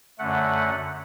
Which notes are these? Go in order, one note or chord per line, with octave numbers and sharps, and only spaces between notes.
F#2 D3 A3 F#5